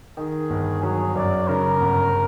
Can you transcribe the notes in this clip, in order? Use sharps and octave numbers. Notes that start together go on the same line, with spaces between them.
D#3 G#4
G1
F#3 G#4
F#2 D5
C#3 A#4
G1